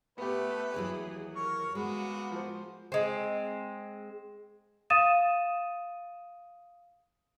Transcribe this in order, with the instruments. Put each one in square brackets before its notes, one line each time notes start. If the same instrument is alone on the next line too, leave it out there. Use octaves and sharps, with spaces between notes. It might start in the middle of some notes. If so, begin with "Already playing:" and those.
[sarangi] A3 [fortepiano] B3 G4 [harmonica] B4
[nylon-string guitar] D#2 E3 F#3 [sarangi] G#4
[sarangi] A#4 [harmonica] C#5 C#6
[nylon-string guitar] G#3 [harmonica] A#3 B3 [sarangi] F#4
[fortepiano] F3 C5
[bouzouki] G#3 C4
[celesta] F5 D#6 A6 D#7 E7